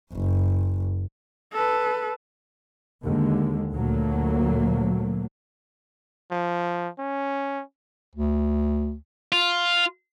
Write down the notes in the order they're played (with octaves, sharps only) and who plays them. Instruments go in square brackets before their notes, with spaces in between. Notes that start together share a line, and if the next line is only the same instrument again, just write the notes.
[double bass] F#1
[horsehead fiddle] A4 B4
[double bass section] D#2 D3 G#3
D2 A#2 F#3 A3 A#3
[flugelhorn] F3
C#4
[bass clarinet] D2
[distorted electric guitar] F4